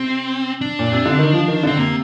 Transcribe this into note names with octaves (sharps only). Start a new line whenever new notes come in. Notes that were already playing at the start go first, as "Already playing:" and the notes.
Already playing: C3 C4
D4
A#2
C3
D3
D#3
F3
D#3
D3 C4
C3 A#3